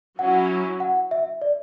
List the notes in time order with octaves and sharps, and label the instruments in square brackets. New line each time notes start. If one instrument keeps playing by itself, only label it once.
[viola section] F#3 C#4 E4 [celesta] F#5
[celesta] F#5
E5
D5